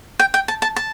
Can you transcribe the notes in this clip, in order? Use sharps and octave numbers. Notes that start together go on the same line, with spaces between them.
G5
G5
A5
A5
A5